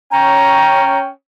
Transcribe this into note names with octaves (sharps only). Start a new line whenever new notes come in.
C#4 G5 A#5